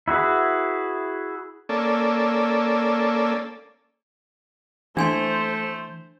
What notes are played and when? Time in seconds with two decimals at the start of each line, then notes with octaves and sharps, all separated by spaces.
0.08 E4 F#4 G#4 B4
1.69 A#3 C#4 A4 D5
4.97 E3 A3 D4 C5 G#5 C6